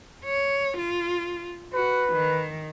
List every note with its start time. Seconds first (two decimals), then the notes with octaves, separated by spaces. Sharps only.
0.24 C#5
0.78 F4
1.74 F#4 B4
2.13 D#3